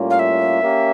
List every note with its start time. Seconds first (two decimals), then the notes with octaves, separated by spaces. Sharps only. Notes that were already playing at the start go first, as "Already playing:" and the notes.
Already playing: A2 G3 A#3 C#4 F4
0.10 F5
0.19 E5
0.62 A#3 C#4 G4